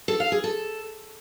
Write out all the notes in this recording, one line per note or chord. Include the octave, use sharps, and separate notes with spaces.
A4
F5
G#4
A4